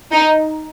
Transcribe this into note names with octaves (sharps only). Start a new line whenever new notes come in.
D#4